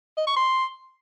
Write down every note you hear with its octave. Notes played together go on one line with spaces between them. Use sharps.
D#5
C#6
C6